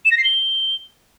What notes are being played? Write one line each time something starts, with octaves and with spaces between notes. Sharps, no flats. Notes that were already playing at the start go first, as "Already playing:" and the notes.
E7
A#6
C7
G7